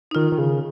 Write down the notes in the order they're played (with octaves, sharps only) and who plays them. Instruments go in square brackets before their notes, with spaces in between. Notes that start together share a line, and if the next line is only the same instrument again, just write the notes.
[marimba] D#4
[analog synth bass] D#3 [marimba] F4
[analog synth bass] D#3
C#3